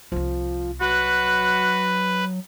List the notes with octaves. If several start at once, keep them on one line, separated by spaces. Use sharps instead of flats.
C2 F3 F4
F#3 F#4 B4